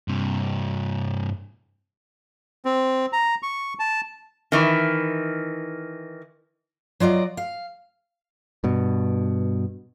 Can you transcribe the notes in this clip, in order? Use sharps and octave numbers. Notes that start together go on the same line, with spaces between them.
G2 C3
C4
A#5
C#6
A5
D#3 E3
F#3 F4 D5 D#5
F5
G2 B2